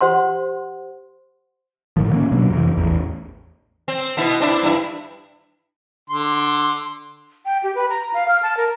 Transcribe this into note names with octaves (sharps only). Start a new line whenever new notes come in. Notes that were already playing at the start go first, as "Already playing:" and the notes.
G4 C5 F#5 C6
A2 D#3 F3
D#3 A#3 C#4
B2 F#3 A#3 D4
F2 C3 E3
A1 E2
C4
B2 B3 E4
C4 D4 E4
G2 E4
D3 C6
G5
G4
B4
A#5
F5
F6
A5
A#4